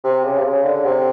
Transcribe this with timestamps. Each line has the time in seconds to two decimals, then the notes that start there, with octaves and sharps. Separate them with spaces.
0.04 C3
0.24 C#3
0.38 C3
0.44 C#3
0.64 D3
0.84 C3